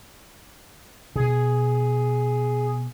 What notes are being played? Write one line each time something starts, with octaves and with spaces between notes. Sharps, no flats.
B2 G#4